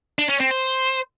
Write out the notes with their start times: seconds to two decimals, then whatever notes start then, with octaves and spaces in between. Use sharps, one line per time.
0.19 D4
0.29 C#4
0.40 C4
0.51 C5